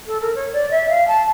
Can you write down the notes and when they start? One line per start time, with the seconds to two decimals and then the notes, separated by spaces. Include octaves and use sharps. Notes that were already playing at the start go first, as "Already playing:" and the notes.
0.07 A4
0.21 A#4
0.35 C#5
0.53 D5
0.71 E5
0.89 F5
1.08 A5